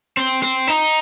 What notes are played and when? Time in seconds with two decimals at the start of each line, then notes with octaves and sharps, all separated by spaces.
0.17 C4
0.42 C4
0.68 D#4